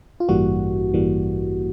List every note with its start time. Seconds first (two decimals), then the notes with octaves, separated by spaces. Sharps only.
0.20 F4
0.28 A1 G2 E3 G3 A#3 F#4
0.94 A1 G2 E3 G3 A#3